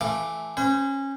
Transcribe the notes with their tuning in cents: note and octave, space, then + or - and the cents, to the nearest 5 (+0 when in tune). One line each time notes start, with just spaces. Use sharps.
E3 +0 A3 -15 D6 +0
C#4 -20 C5 -40